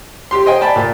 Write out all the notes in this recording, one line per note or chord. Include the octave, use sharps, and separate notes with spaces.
G4 C6
C5 D#5 G5 G#5
D5 G5 A5 B5
A#2